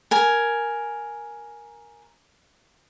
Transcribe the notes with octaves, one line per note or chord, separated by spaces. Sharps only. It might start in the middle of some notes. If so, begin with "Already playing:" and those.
A#4 G#5